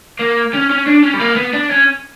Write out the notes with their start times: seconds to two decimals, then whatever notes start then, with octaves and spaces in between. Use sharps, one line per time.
0.19 A#3
0.54 C#4
0.70 C#4
0.87 D4
1.03 C#4
1.14 G3
1.20 A#3
1.36 B3
1.54 D4
1.71 C#4